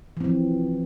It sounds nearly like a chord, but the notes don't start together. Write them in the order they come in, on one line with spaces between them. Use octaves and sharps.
E3 C4 F3